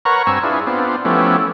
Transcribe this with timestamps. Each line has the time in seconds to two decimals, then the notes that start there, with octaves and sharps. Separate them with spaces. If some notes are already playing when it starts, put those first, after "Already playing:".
0.05 A#4 B4 C#5 F#5 A#5 C#6
0.27 G2 C4 G#5 C#6 E6
0.43 D4 E4 F4 G#4 B4
0.67 B3 C4 D4 F4
1.05 F3 A3 B3 C#4 E4 G4